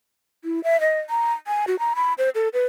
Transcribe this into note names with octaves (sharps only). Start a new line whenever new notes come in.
E4
E5
D#5
A#5
G#5
F#4
A#5
B5
C5
A4
B4